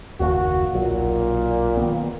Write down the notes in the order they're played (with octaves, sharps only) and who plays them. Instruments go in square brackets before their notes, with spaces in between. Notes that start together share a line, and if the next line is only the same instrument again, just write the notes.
[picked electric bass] F#1 D#2 A#3 [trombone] F#4
[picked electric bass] B1 F#3 [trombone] A#2
[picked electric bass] D#3 A#3 B3